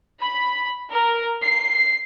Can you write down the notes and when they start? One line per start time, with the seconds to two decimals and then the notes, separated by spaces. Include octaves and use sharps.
0.20 B5
0.91 A#4
1.43 C7